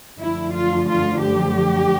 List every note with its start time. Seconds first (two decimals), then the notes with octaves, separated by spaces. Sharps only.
0.18 F#2 D3 F3 A3 E4
0.53 F4
0.88 F4
1.22 G4